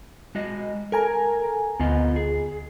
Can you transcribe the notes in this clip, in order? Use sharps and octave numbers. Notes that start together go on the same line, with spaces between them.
G#3 F#4 D#5
A4 A#4 G#5 A#5
D2 B3 F4 D#5
G#4